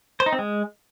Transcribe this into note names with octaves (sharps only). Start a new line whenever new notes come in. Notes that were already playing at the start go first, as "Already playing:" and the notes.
C5
D#4
C4
G#3